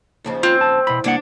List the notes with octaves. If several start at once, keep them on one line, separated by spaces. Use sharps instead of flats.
D#2 C#3 F3
C4 F4
A5
E2 B2 B5
C2 A#3 D4 F#5